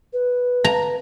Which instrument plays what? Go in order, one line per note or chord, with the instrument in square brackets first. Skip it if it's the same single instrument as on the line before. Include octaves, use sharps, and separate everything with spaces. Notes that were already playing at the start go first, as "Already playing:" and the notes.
[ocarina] B4
[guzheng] A#5